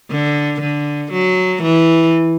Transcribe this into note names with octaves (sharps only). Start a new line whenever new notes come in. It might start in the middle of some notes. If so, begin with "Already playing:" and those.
D3
D3
F#3
E3